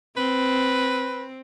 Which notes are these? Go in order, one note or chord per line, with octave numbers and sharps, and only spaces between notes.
C4 B4